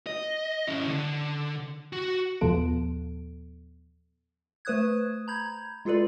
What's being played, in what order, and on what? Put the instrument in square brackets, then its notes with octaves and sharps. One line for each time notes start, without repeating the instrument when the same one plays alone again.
[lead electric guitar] D#5
C#4 E4
D3
F#4
[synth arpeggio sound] D#2 A#2 F3 B3 A4 D7
[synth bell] A3 B4 C5 D#6 F#6 G#6
A#5 B5 G6 G#6
G#3 F4 G#4 A4 B4 D5